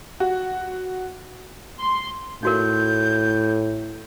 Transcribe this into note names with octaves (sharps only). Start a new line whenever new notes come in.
F#4
C6
A2 D#4 F#4 A#4 G6